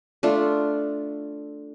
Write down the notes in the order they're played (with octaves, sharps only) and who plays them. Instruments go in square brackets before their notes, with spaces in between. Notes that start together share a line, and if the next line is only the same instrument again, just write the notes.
[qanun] A3 D4 F4